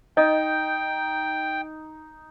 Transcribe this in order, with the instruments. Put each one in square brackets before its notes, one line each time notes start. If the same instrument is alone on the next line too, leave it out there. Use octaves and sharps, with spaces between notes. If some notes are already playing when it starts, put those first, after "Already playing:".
[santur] D#4 [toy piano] D#5 [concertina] G5